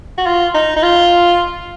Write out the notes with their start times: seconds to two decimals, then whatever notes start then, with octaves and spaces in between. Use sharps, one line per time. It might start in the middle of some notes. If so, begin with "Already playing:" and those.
0.18 F#4
0.26 F4
0.55 D#4
0.76 D#4
0.83 F4